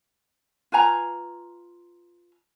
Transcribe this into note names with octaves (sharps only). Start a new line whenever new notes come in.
F4 B4 G#5 A#5